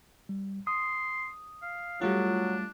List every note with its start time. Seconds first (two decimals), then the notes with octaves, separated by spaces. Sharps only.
0.29 G3
0.67 C6 D#6
1.63 F5
2.01 F#3 G3 A3 D4 F4